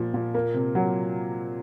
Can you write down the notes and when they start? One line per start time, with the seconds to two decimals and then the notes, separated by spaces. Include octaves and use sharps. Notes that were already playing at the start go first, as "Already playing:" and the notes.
Already playing: A#2 F3
0.14 A#2
0.34 A#3
0.54 C3
0.75 F#3